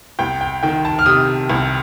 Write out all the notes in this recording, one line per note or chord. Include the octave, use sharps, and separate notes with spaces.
C2 G5
G5
D#3 G5
A5
F6
C3 D#6
C2